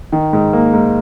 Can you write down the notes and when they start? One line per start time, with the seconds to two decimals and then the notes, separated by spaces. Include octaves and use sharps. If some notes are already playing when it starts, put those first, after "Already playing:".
0.12 D#3
0.33 G#2
0.53 A#3
0.73 G#2